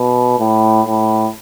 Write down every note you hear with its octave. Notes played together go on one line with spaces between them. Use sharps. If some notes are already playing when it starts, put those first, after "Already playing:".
Already playing: B2
A2
A2